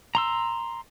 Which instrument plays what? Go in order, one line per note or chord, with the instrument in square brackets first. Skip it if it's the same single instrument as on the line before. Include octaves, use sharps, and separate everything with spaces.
[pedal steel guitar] A#5 C6 E6